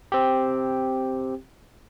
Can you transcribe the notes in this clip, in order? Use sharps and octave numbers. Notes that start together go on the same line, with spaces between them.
C4 G4